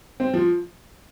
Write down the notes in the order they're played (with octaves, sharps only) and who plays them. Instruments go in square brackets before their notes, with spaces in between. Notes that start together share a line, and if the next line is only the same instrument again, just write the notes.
[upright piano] C4
F3